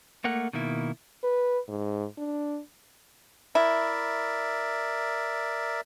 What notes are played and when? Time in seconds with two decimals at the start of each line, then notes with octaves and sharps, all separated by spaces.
0.24 A3 A#3 A#4 F#5
0.53 B2 D#3 A#3 E4
1.24 B4
1.68 G#2
2.17 D4
3.55 E4 A#4 D5 E5